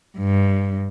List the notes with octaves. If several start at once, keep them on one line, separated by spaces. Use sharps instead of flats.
G2